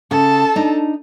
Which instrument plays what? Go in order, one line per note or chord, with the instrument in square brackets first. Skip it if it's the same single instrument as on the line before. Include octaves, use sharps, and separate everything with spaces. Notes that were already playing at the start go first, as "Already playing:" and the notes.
[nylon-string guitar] C#3 [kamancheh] A4 A5
[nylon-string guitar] D4 D#4